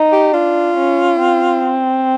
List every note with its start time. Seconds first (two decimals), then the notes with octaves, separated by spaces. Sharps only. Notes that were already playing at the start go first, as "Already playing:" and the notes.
Already playing: D#4
0.12 G4
0.34 D4 F4
0.77 C#4
1.20 C4